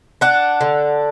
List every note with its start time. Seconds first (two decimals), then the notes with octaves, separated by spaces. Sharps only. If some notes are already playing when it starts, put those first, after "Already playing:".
0.21 D4 F#5
0.61 D3